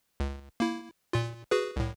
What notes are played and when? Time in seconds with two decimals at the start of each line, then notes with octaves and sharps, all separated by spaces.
0.20 C#2
0.60 A#3 E4
1.13 A#2 F4
1.51 F#4 G#4 B4
1.76 C2 A2